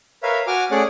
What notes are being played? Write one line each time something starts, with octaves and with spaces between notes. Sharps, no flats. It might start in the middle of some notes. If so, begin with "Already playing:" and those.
A#4 B4 C#5 E5 F5
F#4 G#5 D6 F6
A3 C#4 G#4 C#5 D5 F#5